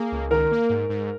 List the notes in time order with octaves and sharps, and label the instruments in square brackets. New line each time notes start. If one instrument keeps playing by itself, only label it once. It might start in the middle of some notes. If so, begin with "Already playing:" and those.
Already playing: [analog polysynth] A#3 [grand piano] G#4
[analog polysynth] C#2
[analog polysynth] D#3 [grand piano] A#4
[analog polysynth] A#3
G#2
G#2